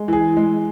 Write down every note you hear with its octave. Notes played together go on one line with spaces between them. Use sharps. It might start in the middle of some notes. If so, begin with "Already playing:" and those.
Already playing: G#3
E3 G#4
G#3